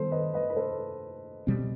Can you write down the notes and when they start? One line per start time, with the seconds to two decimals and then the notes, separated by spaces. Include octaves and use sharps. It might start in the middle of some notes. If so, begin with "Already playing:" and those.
Already playing: D#3 G3 B3 A4 C5
0.11 B4 D#5
0.34 B4 D#5
0.50 B4
0.56 A4 C5
1.47 B2 G3 C4